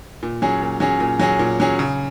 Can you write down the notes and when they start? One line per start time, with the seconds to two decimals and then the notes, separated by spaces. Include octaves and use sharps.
0.23 A#2
0.42 F#3 C#4 G#4
0.62 A#2
0.80 F#3 C#4 G#4
1.00 A#2
1.20 F#3 C#4 G#4
1.39 A#2
1.60 F#3 C#4 G#4
1.79 C#3